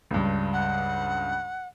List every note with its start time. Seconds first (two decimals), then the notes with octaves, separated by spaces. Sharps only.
0.11 C#2 G2
0.53 F#5